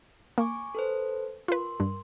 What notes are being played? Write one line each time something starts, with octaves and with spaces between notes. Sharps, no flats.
A#3 G#5 C#6 D6
A4 B4 C5
F4 A#4 B4 C6
G2